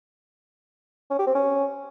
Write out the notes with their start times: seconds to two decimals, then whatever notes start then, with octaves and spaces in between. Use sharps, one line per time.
1.10 C#4
1.19 G4
1.27 C4
1.35 C#4